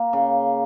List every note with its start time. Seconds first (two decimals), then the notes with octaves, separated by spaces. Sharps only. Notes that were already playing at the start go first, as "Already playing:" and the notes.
Already playing: A#3
0.13 C#3